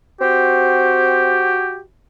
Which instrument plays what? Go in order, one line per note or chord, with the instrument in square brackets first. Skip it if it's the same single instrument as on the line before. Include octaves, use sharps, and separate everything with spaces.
[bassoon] C4 [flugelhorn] F#4 [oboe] G4